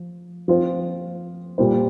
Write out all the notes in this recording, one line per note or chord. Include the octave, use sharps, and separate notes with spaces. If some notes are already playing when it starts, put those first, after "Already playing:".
Already playing: F3
F3 C4 F4 C5
A#2 G3 A#3 F4 C5